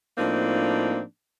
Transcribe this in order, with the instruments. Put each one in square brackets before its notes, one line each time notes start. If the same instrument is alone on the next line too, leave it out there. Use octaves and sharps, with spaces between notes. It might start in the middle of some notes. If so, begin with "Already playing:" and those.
[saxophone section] A2 F3 A#3 C4 D4 D#4